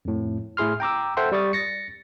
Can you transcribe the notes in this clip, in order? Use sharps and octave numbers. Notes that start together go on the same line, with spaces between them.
F2 A2
A2 E4 G#4 C6 F6
G5 A#5 D6 E6
A4 C5 E5 F#5 G5 C6
G3 D5 C#6 D#6 A6
A6 A#6 C#7